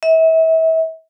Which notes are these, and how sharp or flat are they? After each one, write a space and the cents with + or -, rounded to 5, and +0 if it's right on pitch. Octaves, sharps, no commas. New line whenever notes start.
E5 -35